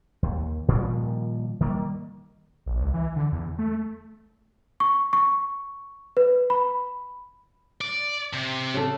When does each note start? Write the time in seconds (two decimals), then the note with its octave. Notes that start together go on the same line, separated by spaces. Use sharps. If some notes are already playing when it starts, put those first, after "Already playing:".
0.23 D#2
0.68 A#2 D#3 F3 G3
1.60 D#3 G3 A#3
2.66 A#1
2.81 C#2
2.94 E3
3.16 D3
3.32 E2
3.58 A3
4.80 C#6
5.13 C#6
6.17 B4
6.50 B5
7.81 D5
8.33 C3
8.74 C#3 A4